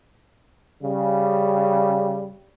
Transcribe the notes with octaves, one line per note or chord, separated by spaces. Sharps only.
C#3 G3